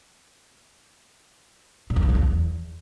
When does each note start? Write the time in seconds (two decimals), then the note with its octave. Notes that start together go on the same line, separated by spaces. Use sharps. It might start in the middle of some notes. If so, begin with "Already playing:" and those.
1.90 A#2
1.96 F2
2.03 G#2
2.09 F2
2.15 E2